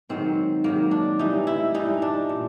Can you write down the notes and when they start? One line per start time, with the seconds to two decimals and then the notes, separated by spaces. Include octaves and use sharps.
0.09 G#2 D#3 F#3 C4
0.64 G#2 D#3 F#3 A#3
0.91 D4
1.19 A2 E3 G3 D#4
1.47 E4
1.74 G2 E3 G3 D#4
2.02 D4
2.29 A#2